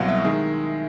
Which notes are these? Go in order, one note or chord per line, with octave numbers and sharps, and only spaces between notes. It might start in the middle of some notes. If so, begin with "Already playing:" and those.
Already playing: C2 B2 F#3 F5 F#5
E5
D#3 G#3